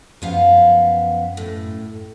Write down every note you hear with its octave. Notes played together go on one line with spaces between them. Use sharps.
F#2 F3 B3 F5
A2